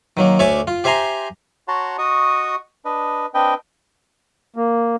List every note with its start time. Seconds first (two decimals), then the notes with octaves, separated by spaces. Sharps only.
0.17 D#3 F#3 A#3
0.39 D2 C#5 D5 E5 G#5 D6
0.67 F4
0.84 G4 C5 E5 G#5 A#5 C6
1.68 F#4 C#5 F#5 A5 A#5 C6
1.98 F#4 D#5 C#6 D#6
2.85 D4 B4 D#5
3.34 C4 D4 B4 D#5 G5
4.56 A#3